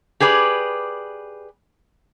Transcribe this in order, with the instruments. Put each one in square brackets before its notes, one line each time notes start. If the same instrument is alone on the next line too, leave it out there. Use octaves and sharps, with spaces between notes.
[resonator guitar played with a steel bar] G4 G#4 B4 D5